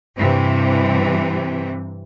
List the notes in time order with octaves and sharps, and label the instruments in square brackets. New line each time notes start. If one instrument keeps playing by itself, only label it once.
[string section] G2 C3 E3